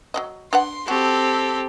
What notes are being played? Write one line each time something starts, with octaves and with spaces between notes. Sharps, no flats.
F#3 C4 D#5
D4 B4 F#5 C6
C4 F#4 G4 A4